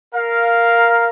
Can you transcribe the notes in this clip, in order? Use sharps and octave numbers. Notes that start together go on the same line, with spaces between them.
A#4 F5